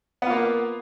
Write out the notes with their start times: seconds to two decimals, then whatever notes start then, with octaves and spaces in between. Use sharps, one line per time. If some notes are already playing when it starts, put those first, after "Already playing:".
0.22 B3
0.26 F4
0.30 A#3